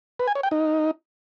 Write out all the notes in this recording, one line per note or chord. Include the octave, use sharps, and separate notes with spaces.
B4
G#5
C#5
G5
D#4